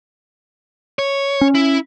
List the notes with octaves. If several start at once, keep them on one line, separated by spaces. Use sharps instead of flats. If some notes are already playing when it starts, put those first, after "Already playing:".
C#5
C#4
E4